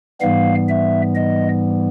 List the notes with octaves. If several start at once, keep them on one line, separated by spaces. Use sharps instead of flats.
G#2 E3 G3 B3 F5
E5
D#5